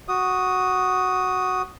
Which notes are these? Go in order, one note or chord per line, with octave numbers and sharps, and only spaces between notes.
F#4 D#6